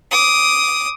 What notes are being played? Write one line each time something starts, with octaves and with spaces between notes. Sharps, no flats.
D6 D#6